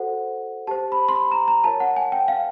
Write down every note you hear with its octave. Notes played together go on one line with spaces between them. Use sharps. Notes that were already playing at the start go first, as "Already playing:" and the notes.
Already playing: F#4 A4 C5 F#5
G4 C5 A5
B5
C6
B5
A#5
A#5
F4 A#4 C#5 A5
F#5
G#5
G5
F5